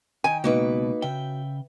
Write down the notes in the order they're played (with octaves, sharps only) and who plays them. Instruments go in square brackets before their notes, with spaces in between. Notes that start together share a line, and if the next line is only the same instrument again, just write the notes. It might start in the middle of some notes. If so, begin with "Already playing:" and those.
[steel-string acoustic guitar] D#3 G5 [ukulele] G#5
[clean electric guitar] C#2 B2 [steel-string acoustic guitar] A#3 D#4 B4 [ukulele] F#4
[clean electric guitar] C#3 G5 [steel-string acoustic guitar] E5